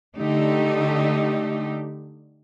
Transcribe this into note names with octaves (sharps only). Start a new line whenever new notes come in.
D3 A3 D#4 G4